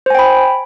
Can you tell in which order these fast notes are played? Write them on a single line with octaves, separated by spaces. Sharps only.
C5 G#5 G5 B5